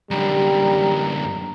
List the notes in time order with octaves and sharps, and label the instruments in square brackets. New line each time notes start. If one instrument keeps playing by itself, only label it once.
[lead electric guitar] F#2 D3 [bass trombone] G3 [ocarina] A#5